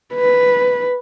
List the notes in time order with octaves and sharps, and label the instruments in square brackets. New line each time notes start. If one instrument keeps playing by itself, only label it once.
[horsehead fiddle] B4